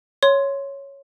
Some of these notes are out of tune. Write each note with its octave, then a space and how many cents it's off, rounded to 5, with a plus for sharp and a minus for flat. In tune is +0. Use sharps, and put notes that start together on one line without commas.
C#5 +0 C6 +0